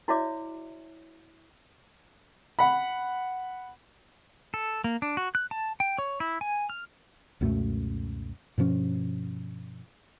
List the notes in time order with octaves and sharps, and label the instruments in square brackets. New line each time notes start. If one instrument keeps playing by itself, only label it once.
[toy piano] E4 F#4 C#5 D5 E5 D6
[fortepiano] F#5 B5
[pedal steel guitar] A4
A#3
D4
F#4
F#6
A5
G5
C#5
E4
G#5
F6
[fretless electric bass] C#2 F#2 B2 A3
G2 B2 F3 C#4